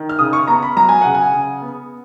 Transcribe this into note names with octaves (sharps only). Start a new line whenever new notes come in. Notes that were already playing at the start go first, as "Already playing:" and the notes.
Already playing: D#3
F6
C#3 D#6
C#6
B3 A#5
B5
F#3 A#5
G#5
C#3 F#5
G#5
C#3
B3